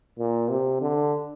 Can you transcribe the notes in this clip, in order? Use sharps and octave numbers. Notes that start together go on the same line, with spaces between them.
A#2
C3
D3